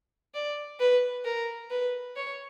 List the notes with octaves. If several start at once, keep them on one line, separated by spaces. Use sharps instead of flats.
D5
B4
A#4
B4
C#5